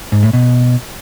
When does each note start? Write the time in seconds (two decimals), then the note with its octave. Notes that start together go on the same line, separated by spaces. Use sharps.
0.12 G#2
0.23 A2
0.33 B2